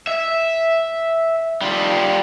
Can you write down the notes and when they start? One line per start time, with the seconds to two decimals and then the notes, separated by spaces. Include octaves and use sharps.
0.07 E5
1.61 G3 F4